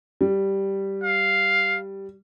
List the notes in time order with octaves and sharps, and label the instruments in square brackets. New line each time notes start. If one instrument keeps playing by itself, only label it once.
[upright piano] G3
[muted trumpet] F5